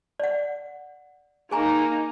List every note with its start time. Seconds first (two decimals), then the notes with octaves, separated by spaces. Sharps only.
0.20 D5 F#5
1.51 A#3 D#4 G#4 G#5 A#5